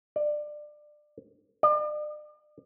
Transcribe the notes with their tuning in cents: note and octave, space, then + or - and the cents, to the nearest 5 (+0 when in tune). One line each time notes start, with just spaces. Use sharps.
D5 +20
D5 +40